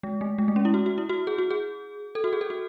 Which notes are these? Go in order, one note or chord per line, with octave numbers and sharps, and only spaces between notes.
G#3
A3
G#3
A3
C#4
E4
F#4
F#4
E4
F#4
G#4
F#4
G#4
A4
F#4
G#4
A4
F#4